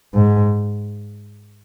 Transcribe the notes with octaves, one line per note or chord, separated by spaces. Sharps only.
G#2